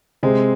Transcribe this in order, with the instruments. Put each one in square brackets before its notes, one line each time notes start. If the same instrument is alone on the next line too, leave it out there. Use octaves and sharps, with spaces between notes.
[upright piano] C3 [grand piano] G#3 C4